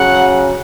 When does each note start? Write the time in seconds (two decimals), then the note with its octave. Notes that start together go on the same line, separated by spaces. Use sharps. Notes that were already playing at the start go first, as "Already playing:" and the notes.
Already playing: C#3 F#3 F#5